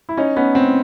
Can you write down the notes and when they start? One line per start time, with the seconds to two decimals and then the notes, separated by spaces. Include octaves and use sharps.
0.09 E4
0.17 C#4 D#4
0.36 B3 C#4
0.55 C4